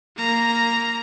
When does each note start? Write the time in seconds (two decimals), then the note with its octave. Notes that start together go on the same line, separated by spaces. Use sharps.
0.16 A#3 A#5